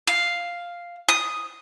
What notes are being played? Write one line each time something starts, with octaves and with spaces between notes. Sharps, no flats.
F5
D#6